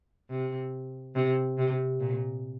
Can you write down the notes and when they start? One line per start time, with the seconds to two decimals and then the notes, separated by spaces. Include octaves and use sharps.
0.30 C3
1.15 C3
1.58 C3
2.00 A#2